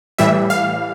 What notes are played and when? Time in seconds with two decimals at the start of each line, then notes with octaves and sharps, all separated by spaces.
0.18 A2 E3 G3 E5
0.50 F5